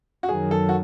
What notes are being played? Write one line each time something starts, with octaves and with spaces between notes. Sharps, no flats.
F#4
F#2 D#3 F#3 G#4
A4
F#4